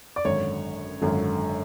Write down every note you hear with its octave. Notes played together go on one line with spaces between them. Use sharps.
D5
G#1 F#2 D3 C#5
G#1 F#2 D3